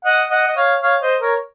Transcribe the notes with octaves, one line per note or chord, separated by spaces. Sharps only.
D#5 F#5
D#5 F#5
D#5
C#5 F5
C#5 F5
C5 D#5
A#4 C#5